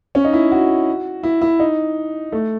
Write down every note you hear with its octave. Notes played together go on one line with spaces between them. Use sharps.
C#4
D#4
E4
F#4
E4
E4
D#4
A3